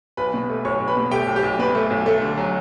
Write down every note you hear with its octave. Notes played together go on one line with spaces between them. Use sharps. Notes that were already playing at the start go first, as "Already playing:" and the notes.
B1 B4 B5
B2
A3
B1 C#5 C#6
B1
B4 B5
B2
A3 G4 G5
B1
G4 G5
B1
B2 B4
A3
B1
A3 A4
D3
F#3